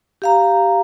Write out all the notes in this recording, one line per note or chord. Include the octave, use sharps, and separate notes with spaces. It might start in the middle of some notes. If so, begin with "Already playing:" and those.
G4 F5 A#5